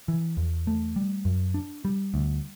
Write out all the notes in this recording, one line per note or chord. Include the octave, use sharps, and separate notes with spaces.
E3
E2
A3
G3
F#2
D4
G3
D2